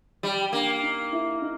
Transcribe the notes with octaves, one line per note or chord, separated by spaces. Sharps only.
G3
A#3 D4
D#4
E4
D#4